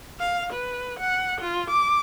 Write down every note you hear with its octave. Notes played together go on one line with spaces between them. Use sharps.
F5
B4
F#5
F4
D6